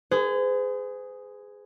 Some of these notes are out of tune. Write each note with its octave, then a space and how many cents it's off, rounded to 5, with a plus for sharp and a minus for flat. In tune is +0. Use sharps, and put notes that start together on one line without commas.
G#4 +0 C5 -45